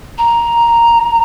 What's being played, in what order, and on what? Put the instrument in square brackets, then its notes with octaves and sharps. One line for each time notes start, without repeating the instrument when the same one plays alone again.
[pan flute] A#5